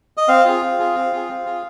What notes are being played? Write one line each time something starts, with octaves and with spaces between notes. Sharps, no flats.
D#5
C4 F5
F4 G#4
C4
F4 G#4
C4
F4 G#4
C4
F4 G#4